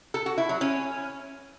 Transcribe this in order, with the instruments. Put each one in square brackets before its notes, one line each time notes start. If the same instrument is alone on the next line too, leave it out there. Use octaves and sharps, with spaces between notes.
[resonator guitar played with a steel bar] A4
F#4
E4
F#3
C#4